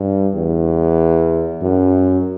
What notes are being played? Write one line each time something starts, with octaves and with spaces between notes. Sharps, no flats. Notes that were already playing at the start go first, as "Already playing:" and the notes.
Already playing: G2
E2
F#2